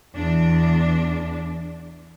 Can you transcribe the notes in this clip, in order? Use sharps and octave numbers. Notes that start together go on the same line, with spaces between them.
E2 D4